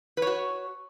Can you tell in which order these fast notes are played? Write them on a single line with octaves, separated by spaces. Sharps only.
B4 C#5 F#4